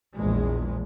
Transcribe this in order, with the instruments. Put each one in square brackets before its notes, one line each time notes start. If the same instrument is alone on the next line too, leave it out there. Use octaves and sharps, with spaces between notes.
[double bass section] A#1 E2 G#3